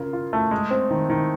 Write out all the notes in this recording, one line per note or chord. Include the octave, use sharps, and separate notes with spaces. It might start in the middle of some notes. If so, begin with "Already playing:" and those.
Already playing: C#3 F4 A#4
F4
A3
G#3
C4
D#3
D#3